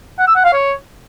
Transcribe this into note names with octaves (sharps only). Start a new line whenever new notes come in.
F#5
E6
F#5
F5
C#5